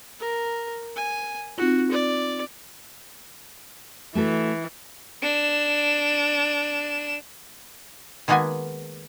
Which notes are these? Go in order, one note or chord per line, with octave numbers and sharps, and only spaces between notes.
A#4
G#5
C4 D#4 F4 F#4
D5
E3 A3 F#4 A4
D4 E7
D#3 G#3 A#3 B3 F#4 G#5